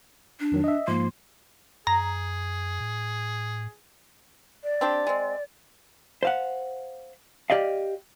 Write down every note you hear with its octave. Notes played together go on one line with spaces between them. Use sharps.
D4
F2 D#3 F#3
D#5 E5
G#2 F3 A#3 C6
F#2 G#4 A#5
A2
D5
C4 D4 G4
G#3 C4
C5 F5 F#5
G4 D5 D#5 F5